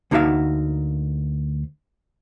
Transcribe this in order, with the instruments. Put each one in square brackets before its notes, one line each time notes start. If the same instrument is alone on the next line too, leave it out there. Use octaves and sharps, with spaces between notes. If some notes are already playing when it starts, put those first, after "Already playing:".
[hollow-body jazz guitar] D2 A#3 D#4 F#4 E5 F5